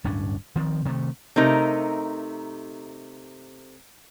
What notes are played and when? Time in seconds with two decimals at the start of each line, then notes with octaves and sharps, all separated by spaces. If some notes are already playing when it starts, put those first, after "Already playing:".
0.04 D1 G2 C#4 D4
0.56 D#3 F3 C4
0.85 C3 D#3 G3 A3
1.36 C3 A3 D#4 A#4